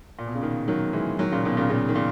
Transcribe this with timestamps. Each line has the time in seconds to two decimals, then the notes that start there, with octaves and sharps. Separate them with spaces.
0.19 A#2
0.27 B2
0.35 C#3
0.42 B2 D#3
0.68 D#3 F#3
0.93 E3 G#3
1.19 D#3 F#3
1.31 A#2 C#3
1.45 B2 D#3
1.57 A#2 C#3
1.70 A#2 C#3
1.89 D#3
1.95 A#2 C#3